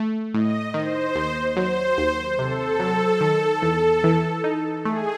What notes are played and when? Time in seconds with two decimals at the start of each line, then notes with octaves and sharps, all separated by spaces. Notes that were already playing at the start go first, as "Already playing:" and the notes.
Already playing: A3
0.34 A2 D#5
0.74 D#3 C5
1.15 D#2
1.56 F#3 C5
1.98 D#2
2.39 C3 A4
2.80 F#3
3.21 D#3
3.62 E2
4.04 E3
4.44 D#4
4.85 A3 G#4